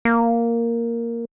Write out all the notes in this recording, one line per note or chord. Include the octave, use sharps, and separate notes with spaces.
A#3